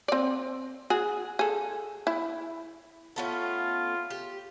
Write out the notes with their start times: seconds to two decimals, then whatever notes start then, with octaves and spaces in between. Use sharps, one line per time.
0.08 C4 D5
0.90 F#4 G#4
1.39 G#4 A4
2.07 E4
3.16 A3 B3 C#4 F4
4.10 G4